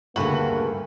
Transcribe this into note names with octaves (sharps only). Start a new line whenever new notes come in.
D2 G2 C#3 A#3 F#4 A4 B4 F#7